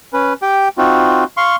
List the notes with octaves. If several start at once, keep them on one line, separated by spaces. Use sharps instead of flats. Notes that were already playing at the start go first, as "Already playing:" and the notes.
C#4 B4
G4 G5
C4 D#4 F4 F#4
F5 C6 C#6